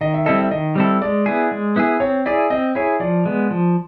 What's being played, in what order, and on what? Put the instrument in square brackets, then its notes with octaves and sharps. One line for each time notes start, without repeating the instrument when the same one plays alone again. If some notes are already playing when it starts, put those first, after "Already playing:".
[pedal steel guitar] D#3 [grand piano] D#5
[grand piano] E5
[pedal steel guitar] G3 C4 E4 A4 [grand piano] D#5
[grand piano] E5
[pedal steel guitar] D#3 [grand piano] D#5
[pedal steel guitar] G3 C4 E4 A4
[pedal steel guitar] G#3 [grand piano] D5
[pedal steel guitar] B3 E4 G#4
G#3
B3 E4 G#4
[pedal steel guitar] C4 [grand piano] C#5
[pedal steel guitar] E4 G#4 [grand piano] D5
[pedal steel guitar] C4 [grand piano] D#5
[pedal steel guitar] E4 G#4 [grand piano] C#5
[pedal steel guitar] F3 [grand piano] D5
[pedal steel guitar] G#3 B3
F3